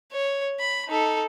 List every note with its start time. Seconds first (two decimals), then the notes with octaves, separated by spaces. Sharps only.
0.12 C#5
0.60 B5
0.88 D#4 A4